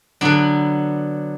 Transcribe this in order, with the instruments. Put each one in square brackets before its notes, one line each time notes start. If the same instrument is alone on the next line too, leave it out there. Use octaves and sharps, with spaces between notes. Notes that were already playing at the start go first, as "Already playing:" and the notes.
[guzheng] D3 F#3 B3 D4